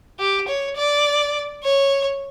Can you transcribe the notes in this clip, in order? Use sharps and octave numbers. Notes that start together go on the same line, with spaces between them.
G4
C#5
D5
C#5